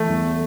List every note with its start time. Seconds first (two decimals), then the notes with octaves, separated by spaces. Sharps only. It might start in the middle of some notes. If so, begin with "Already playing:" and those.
Already playing: E3 A3
0.09 E2